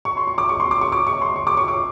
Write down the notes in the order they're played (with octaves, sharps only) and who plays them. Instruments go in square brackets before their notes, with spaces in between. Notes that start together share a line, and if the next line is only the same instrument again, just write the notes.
[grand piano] C#6
C6
C#6
D6
C#6
C6
D6
C#6
D6
C#6
C6
C#6
D6
C#6
D6